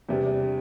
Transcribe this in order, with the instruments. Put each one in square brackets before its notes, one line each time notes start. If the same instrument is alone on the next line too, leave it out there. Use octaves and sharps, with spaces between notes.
[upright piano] E2 C3 G3 D4